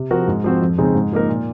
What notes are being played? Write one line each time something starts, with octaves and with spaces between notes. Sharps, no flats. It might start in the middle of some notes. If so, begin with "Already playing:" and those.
Already playing: C3
F3 C4 F#4 A#4
G#2
F3 C4 F#4 C5
F2
C#3 G#3 C4 D#4
G#2
F3 A#3 D#4 A#4
A#2